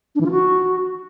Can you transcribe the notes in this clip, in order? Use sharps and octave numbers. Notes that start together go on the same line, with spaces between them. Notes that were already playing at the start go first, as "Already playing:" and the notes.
D4
E3
F4
F#4